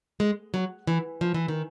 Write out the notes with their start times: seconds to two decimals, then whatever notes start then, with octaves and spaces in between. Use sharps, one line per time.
0.20 G#3
0.54 F#3
0.87 E3
1.21 F3
1.34 E3
1.48 D#3